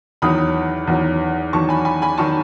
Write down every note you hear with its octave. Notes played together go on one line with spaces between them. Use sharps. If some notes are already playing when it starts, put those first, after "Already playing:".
E2 D#3 F#3 B5 D#6
E2 D#3 F#3
E2 D#3 F#3 A5 C#6
G#5 B5
G#5 B5
G#5 B5
D#3 F#3 A5 C#6